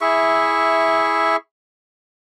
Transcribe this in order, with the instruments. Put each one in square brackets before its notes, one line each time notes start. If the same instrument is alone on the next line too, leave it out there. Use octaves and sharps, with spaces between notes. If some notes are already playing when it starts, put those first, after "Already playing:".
[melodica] E4 G#4 E5 C#6